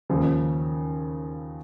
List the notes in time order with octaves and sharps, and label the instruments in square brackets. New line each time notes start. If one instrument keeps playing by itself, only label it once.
[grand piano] D#2 C#3 F3